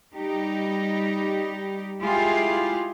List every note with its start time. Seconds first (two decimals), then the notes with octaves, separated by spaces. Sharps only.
0.13 G3 D#4 G4
2.00 G#3 E4 F4 G4 G#4